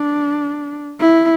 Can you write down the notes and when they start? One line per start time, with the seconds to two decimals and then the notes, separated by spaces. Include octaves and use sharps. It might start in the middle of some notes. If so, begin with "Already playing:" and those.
Already playing: D4
1.00 E4